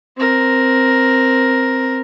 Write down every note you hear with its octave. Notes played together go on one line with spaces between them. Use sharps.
C4 A#4